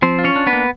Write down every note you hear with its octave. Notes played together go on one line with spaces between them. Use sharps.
F3 C4 C5
F4
C#4 C#5
D4
B3 B4
A#3